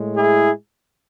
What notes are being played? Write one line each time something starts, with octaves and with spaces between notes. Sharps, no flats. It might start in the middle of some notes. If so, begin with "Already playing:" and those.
Already playing: A2 G#3
E4 G#4